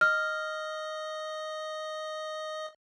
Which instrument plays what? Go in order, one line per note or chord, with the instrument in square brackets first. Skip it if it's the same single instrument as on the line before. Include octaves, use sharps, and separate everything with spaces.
[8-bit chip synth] D#5 D#6 [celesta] F6